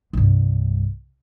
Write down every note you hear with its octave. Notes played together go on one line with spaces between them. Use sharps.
C2 G2